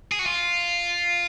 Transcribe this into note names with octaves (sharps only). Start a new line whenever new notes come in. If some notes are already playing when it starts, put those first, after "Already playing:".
G#4
F#4
F4